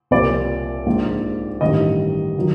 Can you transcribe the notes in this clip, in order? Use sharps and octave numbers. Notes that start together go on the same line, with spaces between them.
C2 A#2 F3 D5
A#1 G#2 F3
A1 G2 D#3 D#5
D#3 F#3